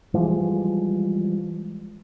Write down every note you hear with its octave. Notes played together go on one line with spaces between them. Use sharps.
E3 F3 G3 G#3